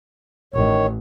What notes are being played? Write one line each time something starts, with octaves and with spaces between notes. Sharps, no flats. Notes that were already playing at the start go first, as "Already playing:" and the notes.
A1 D#3 C#5